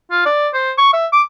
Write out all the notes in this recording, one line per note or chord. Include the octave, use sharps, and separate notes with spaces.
F4
D5
C5
C#6
E5
D6